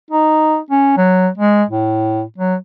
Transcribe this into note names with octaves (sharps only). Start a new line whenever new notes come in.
D#4
C#4
F#3
G#3
A2
F#3